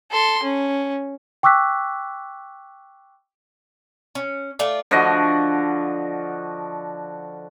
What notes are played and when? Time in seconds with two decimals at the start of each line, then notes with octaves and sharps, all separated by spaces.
0.12 A4 C6
0.43 C#4
1.43 G5 C#6 D6 E6 F#6 B6
4.15 C#4
4.59 A3 F4 D5
4.91 D3 F3 F#4 D#5